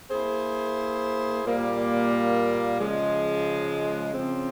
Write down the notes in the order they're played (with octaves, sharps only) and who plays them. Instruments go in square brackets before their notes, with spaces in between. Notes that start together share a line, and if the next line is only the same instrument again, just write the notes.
[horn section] A#3 E4 G#4 C5
A#2 G3 A#3
C#3 F3 G#3
C#3 F3 C4